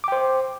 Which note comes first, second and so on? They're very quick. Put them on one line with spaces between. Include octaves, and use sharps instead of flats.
D6 G5 C5